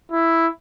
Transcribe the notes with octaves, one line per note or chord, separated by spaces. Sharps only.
E4